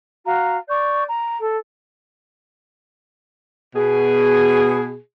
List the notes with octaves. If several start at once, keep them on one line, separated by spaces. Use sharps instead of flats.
F#4 F5 A#5
D5 C#6 G6
A#5
A4
B2 G#4